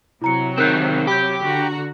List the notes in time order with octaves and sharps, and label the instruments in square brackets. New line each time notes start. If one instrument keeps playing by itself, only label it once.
[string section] C3 F#3 [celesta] E4 A#5 C#7
[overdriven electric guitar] D#3 C4 [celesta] A#4 F#6 G6
[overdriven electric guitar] G4 [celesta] B5 G6
[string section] D3 F#4 A#5